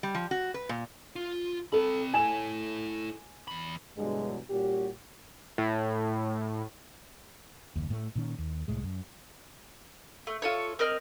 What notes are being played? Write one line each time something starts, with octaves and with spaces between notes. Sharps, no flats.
G3
F3
F#4
B4
A#2
F4
C4 A4 B5
E4 A4 G#5 E7
E2 B5
G2 B2 D3 E3 F#3 G#3
A#2 G3 C#4 F#4 G4
A2
F#1 D#2
A2 A3
A#2 D#3 C#4
D#2
C2 A2 G#3
F#2
A3
F4 A4 C#5
C4 A#4 D#5 F6